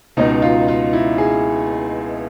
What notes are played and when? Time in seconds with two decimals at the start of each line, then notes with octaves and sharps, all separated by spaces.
0.17 C#2 B2 D#4
0.42 F4
0.68 F4
0.93 E4
1.18 G#4